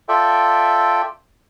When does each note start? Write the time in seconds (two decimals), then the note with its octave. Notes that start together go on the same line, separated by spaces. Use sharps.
0.09 F4 A4 D5 E5 G5